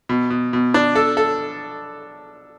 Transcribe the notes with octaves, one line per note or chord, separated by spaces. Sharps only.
B2
B2
B2
D4
A4
A4